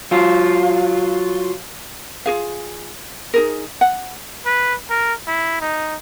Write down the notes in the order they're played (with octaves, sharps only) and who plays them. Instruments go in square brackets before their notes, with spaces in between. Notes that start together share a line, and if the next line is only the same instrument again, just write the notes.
[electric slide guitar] F#3 F4
[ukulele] F4 F#4 G#4 F5
D#4 G#4 A#4
F#5
[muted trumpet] B4
A#4
E4
D#4